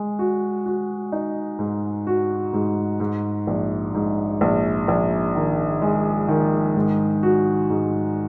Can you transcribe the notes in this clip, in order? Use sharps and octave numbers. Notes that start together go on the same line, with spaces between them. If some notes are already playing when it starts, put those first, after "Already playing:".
Already playing: G#3
F#4
F#4
D#4
G#2
F#4
G#2
G#2
A#1
G#2
A#1
A#1
D#3
G#3
D#3
G#2
F#4
G#2